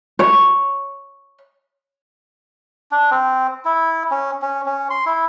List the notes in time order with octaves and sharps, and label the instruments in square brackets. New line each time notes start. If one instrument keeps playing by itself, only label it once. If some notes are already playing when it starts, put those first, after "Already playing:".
[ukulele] C#5
[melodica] D4
C4
E4
C#4
C#4
C#4
C6
E4